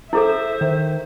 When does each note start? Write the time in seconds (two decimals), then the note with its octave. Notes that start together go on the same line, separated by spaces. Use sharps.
0.13 E4 G#4 A4 C5 E5
0.61 D#3